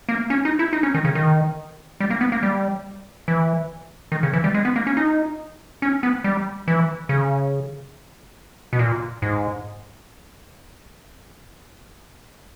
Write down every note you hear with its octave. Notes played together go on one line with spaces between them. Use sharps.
A#3
C#4
D#4
E4
D#4
C#4
D#3
C#3
D#3
G3
A#3
B3
A#3
G3
E3
D#3
C#3
E3
G3
G#3
B3
A#3
C#4
D#4
C#4
B3
G3
E3
C#3
B2
A#2
G#2